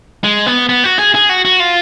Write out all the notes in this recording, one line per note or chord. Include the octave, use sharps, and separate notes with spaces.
G#3
B3
B3
F#4
G#4
G#4
F#4
F#4
F4